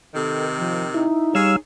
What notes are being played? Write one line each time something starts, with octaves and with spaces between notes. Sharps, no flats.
C3 D#3 A4
F3
D#4 E4
G3 G#4 C#5 F5 E6